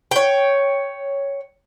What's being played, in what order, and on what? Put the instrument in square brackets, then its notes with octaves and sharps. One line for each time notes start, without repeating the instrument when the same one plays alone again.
[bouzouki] C#5 G5